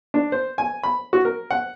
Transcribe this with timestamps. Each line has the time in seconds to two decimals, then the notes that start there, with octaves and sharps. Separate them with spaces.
0.14 D4
0.32 C5
0.58 G#5
0.83 B5
1.13 F#4
1.25 A#4
1.51 F#5